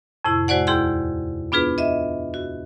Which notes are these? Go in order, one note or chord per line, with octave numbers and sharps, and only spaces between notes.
F2 A2 C3 E4
G#3 F#4 C5 D5 F#5
D#2 E4 G#4 C6 G6
B3 D4 F4 G#4 B4
D#5 E5
F#4